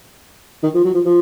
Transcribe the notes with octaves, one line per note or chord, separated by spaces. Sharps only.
D#3
F3
F#3
F3
F3